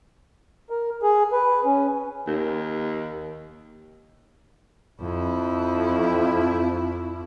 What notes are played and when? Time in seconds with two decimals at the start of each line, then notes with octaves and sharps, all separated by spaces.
0.70 A#4
1.03 G#4
1.32 B4
1.65 C#4
2.27 D#2
5.01 F2 E4